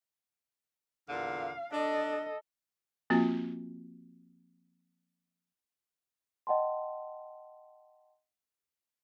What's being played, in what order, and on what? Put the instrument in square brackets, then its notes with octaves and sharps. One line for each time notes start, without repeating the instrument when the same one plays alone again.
[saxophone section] E2 A#2 D3 [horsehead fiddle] F5
[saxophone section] D4 [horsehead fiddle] A4 D#5
[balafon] F3 A#3 C4 F4 F#4
[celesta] D#5 F#5 G5 A5 C6